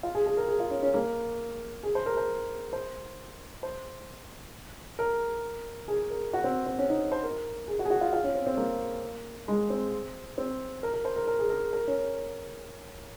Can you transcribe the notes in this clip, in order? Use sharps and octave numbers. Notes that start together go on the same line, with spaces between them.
F4
G#4
G#4
A#4
G#4
F4
C#4
C#4
A#3
G#4
C5
A#4
C5
C5
C5
A#4
G#4
A#4
F#4
C4
C4
C#4
D#4
C5
A#4
G#4
F#4
G#4
F#4
F4
F4
C#4
C4
C4
A#3
G#3
C4
C4
A#4
A#4
C5
A#4
A#4
G#4
A#4
A#4
C#4